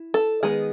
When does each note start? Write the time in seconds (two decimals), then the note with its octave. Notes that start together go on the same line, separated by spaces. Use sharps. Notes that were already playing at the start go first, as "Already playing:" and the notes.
Already playing: E4
0.14 A4
0.43 D#3 G#3 B3 G#4